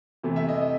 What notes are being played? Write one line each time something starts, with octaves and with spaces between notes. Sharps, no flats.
C3 E3 A3
E5
D#5
D#5